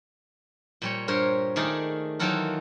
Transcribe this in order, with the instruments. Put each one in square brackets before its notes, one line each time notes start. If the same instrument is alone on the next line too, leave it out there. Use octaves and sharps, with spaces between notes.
[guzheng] A#2 G3 C#5
G2 A#4 C5 C#5
D#3 A3 G#4 A#4 D5
D#3 E3 F#3 F4 A4 A#4